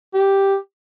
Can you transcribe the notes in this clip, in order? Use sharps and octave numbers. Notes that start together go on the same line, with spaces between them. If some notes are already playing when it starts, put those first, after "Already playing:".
G4